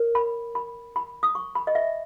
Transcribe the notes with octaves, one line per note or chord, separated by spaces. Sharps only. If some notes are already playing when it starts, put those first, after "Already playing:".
Already playing: A#4 C#5
B5
B5
B5
D#6
C#6
B5
D#5
E5